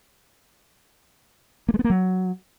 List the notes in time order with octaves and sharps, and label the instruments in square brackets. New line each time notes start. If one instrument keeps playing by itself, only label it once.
[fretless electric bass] A#3
G#3
B3
A#3
F#3